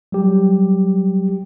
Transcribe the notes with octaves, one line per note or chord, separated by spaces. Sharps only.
F#3 G3 G4